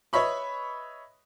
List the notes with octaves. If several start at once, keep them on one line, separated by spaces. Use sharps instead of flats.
B4 C#5 D#5 E5 B5 C#6